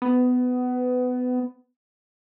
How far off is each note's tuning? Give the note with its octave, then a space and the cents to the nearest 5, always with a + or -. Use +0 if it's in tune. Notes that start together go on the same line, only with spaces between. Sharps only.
B3 +20